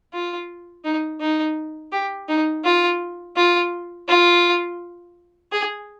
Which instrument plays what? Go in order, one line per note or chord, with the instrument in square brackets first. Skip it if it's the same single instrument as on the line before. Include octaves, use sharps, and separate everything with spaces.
[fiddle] F4
D#4
D#4
G4
D#4
F4
F4
F4
G#4